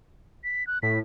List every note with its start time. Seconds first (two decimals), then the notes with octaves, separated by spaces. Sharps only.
0.44 B6
0.67 F#6
0.83 A2 B6